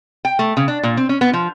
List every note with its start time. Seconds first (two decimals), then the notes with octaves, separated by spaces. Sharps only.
0.25 G5
0.39 A3
0.57 C#3
0.68 D4
0.83 A#2
0.97 C4
1.09 C#4
1.21 B3
1.33 F3